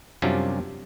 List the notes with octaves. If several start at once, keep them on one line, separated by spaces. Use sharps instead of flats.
F#2 C3 G3 C#4 D4 F4